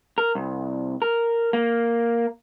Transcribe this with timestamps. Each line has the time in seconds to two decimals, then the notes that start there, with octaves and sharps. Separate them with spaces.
0.18 A#4
0.35 C2
1.02 A#4
1.53 A#3